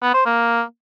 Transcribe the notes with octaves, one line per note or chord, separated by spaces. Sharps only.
B3
C5
A#3